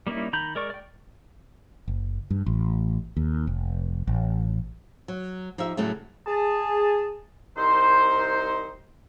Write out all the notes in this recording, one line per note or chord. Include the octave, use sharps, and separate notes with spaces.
G3 A#3 C#4 D#4 E4
D#3 A#5 B5 G6
G#3 A#4 D5 C#6
D5 G5
F#1
G2
A1
D#2
F1
A1
F#3
F3 D#4 G4 E5
A2 C#3 F#3 G3 A3
G#4 A5
C2 C4 D#4 A#4 C5